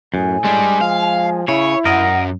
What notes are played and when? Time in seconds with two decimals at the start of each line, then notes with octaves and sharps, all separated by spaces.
0.14 F#2 A2 G#5
0.45 G3 G#3 D4
0.81 F3 F5
1.48 C#3 E4 C#5
1.85 F#2 A#4 D#5 F#5